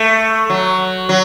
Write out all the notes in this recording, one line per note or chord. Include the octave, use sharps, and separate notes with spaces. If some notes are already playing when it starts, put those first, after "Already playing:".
Already playing: A3
F#3
F#3